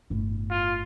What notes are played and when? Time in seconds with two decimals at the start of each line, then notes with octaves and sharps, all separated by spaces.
0.10 G1 A2
0.51 F4